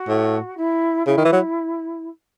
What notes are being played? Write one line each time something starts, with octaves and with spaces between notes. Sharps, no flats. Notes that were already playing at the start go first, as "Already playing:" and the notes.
Already playing: F#4
A2
E4
C#3 E4
D#3
E3
F#3